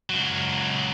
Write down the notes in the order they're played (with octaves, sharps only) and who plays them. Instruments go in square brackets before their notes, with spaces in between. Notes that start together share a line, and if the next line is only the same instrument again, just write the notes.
[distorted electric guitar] C#2 F#3